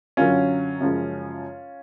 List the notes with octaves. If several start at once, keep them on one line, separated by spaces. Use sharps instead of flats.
F#2 D3 F#3 C#4 F4
F#2 C#3 F3 G#3